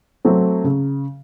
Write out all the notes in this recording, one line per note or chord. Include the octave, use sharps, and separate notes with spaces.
F#3 A3 C4
C#3